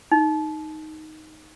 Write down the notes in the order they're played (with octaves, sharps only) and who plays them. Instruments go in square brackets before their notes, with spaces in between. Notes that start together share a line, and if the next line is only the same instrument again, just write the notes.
[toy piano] D#4